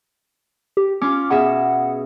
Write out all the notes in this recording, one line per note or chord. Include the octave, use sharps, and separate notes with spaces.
G4
C#4 F4 D6
B2 G#4 E5 F#5